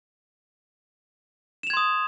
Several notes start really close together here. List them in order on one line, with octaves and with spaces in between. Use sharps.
E7 F7 G#6 C6 D#6